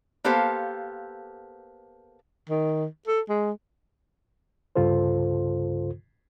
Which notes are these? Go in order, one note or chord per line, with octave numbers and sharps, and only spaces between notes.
A#3 B3 G4 A4 C5 F5
D#3
A4
G#3
C2 G2 C#3 F4 A4 C5